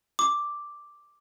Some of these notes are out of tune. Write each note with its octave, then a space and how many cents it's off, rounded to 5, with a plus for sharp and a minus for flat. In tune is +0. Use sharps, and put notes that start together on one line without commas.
D6 +0